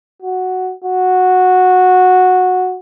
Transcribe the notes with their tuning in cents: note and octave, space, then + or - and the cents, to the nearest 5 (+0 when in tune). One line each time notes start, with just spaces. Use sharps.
F#4 +0
F#4 -10